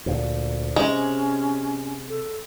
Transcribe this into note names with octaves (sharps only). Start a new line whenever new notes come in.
D2 A#2
C3 G#3 C#4
A4